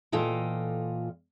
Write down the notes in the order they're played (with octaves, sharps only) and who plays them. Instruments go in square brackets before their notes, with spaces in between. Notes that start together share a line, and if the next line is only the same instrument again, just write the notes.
[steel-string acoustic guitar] A#2 E3 F4 A4 D#5 G5